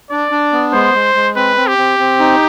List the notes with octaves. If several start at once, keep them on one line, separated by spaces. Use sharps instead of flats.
D4 D5
D4
B3
G#3 C5
G#3
G#3
C4 B4
C4
G4
C4
C4
D#4